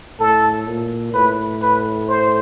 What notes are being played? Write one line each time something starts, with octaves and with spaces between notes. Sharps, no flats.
A2 A4
A#2
A2 B4
B4
C5